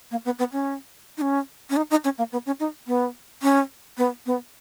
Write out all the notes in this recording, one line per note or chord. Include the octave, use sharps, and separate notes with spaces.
A#3
B3
B3
C#4
D#4
C#4
C#4
D#4
D#4
C#4
A#3
B3
C#4
D#4
B3
C#4
B3
B3